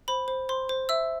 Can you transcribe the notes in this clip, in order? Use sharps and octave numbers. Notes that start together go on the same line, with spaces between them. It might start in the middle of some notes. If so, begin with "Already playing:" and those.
C5 B5
C5
C5 C6
C5
E5 E6